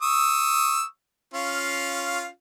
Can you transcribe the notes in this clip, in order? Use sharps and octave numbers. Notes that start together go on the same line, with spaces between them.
C#6 D#6 E6
C#4 F4 F5